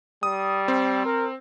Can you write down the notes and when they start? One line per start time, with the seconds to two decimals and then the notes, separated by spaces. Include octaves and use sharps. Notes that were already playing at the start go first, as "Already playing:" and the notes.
0.23 G3 D#6
0.68 C4
1.06 A#4